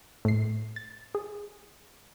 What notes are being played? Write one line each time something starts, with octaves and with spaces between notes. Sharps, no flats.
A2 C7
A6
G#4